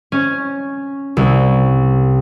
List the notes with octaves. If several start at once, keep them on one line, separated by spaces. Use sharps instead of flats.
C#4
C2